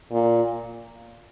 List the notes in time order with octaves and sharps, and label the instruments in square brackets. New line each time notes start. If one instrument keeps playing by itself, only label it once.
[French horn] A#2